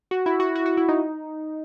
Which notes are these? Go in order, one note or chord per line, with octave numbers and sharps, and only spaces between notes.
F#4
E4
F#4
F#4
F#4
E4
D#4